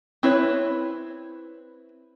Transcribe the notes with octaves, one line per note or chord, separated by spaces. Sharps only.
C4 E4 B4 C#5